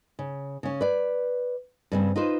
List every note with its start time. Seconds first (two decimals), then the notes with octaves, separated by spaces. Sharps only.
0.19 C#3
0.63 C#3 C#4
0.81 B4 D5
1.92 G2 C#3 C4
2.16 D#4 F4 B4 C5